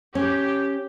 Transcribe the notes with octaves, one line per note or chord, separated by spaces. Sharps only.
C#4 G4